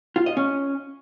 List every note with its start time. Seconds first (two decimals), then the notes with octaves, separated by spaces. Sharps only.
0.16 F4
0.26 D#5
0.37 C#4